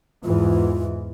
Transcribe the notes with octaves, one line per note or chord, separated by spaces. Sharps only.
E2 G#2 E3 F4